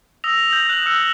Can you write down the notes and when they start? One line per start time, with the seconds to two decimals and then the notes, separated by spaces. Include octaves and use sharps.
0.24 D#6 E6 A#6 F7
0.50 G6 A#6 F#7
0.69 F#6 E7 F#7
0.86 E6 F6 C#7